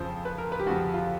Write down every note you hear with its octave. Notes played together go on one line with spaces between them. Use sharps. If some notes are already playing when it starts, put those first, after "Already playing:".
Already playing: F2 C#3 F3 C5
B4
A#4
B4
G4
F2 C#3 F3 F#4
F4